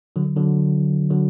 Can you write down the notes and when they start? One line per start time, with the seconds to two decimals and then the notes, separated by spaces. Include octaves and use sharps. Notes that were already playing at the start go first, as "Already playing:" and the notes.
0.16 D3 F#3
0.36 D3 F#3
1.10 D3 F#3